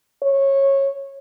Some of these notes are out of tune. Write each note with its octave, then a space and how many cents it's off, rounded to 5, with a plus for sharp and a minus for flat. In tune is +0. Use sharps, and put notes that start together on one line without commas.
C#5 -15